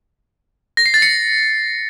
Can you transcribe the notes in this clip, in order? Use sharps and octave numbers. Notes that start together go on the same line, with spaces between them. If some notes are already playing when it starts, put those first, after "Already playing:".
A#6
C7
A6
C#7